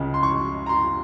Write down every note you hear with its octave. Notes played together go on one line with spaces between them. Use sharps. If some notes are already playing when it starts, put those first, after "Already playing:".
Already playing: C#2 C#3 G#3
C6
C#6
A#5
C6